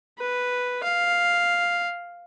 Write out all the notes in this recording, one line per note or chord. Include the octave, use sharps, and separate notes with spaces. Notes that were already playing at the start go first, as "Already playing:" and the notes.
B4
F5